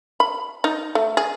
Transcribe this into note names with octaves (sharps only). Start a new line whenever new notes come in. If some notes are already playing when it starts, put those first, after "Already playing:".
B5
D#4
A3
G#4